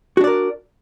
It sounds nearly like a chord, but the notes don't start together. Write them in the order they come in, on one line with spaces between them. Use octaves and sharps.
F#4 D4 D5 A#4